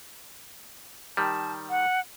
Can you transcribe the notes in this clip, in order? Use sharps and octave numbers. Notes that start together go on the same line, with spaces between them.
D#3 G3 A5
F#5